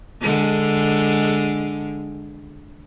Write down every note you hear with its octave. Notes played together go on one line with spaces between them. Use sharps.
D3 G#3